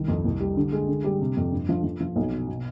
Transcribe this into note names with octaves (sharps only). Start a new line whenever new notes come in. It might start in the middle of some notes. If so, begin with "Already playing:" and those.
Already playing: C2 D#3
F2
C2
G3
D3
G#3
D3
G3
C3
F2
G2
F3
F3
F3
B1
B2
B2